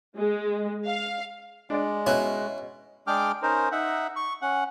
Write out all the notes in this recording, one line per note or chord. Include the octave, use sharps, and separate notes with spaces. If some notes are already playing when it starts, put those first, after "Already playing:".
G#3
F5
G#3 D4 D5
B2 C#4 E4 F#6
G#3 D4 G#4 G5 D6 F6
C#4 D#4 A#4 C5
D#4 E5 F#5
C#6
C#4 F#5